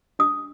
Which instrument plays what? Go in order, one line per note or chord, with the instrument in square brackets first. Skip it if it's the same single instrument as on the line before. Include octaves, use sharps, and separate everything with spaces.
[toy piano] D4 D#6